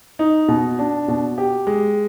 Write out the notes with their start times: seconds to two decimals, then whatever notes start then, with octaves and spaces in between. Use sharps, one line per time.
0.19 D#4
0.48 B2
0.79 D4
1.08 B2
1.38 G4
1.67 G#3